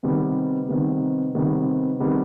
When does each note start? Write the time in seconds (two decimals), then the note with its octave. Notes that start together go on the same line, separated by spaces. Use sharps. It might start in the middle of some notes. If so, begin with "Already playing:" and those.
0.03 C3 D#3 G3 B3
0.69 C3 D#3 G3 B3
1.35 C3 D#3 G3 B3
2.00 C3 D#3 G3 B3